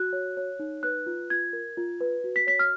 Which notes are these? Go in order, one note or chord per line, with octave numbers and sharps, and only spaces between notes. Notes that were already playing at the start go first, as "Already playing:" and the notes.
Already playing: F#4 F#6
C#5
C#5
D#4
B4 F#6
F4
F4 G#6
A#4
F4
B4
F#4
B6
C#5 B6
F6